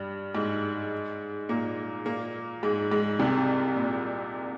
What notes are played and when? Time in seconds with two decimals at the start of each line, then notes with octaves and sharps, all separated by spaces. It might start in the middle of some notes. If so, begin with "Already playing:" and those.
Already playing: G2 G3
0.35 G#2 G#3
1.49 A#2 A#3
2.05 A#2 A#3
2.63 G#2 G#3
2.91 G#2 G#3
3.19 C2 C3
3.76 A#2